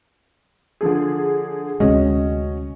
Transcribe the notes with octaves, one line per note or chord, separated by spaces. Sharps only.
D3 F3 G#4
D2 C3 G#3 C#4 F#4 D#5